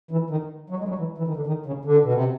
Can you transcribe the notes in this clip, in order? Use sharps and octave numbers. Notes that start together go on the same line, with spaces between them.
E3
D#3
F#3
G#3
G3
F#3
E3
E3
D#3
D3
D#3
C#3
D3
B2
C3